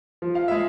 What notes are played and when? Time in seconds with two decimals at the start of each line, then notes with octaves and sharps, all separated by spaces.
0.22 F3
0.35 F5
0.48 G#3 E5